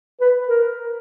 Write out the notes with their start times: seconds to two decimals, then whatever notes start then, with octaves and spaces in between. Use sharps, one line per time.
0.21 B4
0.49 A#4